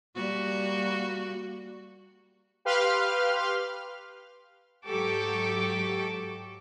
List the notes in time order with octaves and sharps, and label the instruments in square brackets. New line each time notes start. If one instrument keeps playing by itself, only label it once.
[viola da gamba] G3 A#3 F#4
[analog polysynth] G4 B4 F5 C6 F6
[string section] G#2 F#3 G4 A4 C#6 D6